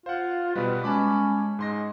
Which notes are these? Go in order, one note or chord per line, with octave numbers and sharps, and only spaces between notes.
F4 C5 F5 F#5
B2 G3 B4 D#5
G#3 C#4 A5 B5 D6
G#2 G#3 C6 A#6